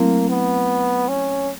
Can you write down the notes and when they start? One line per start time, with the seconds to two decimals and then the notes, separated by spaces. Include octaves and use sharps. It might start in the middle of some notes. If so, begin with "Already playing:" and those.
Already playing: F#3 A3 A#3 C4 E4
0.29 B3
1.08 C#4